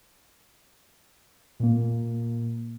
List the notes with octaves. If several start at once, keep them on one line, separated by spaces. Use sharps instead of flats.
A#2 A#3